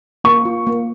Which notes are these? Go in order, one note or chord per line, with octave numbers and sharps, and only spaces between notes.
A#3 C#6
F4
A#3